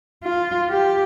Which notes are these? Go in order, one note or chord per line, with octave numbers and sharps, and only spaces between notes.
F4
G4